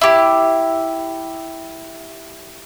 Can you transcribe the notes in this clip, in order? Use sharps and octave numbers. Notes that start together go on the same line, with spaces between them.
E4 G4